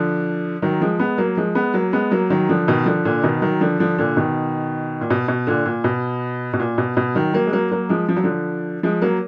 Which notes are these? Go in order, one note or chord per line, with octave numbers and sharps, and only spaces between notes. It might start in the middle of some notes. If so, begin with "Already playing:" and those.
Already playing: D3 F3
D#3 F#3
F3 G#3
G#3 B3
F#3 A#3
F3 G#3
G#3 B3
F#3 A#3
G#3 B3
F#3 A#3
D#3 F#3
D3 F3
B2 D#3
D3 F3
A#2 D3
B2 D#3
D#3 F#3
D3 F3
D3 F3
A#2 D3
B2 D#3
A#2
B2
B2
A#2 D3
A#2
B2
B2
A#2
B2
B2
D#3 F#3
F#3 A#3
G#3
F#3 A#3
F#3 A#3
F3 G#3
F3
F#3
D3 F3
F3 G#3
F#3 A#3